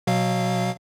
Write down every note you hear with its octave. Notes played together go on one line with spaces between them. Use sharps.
B2 F#3 F5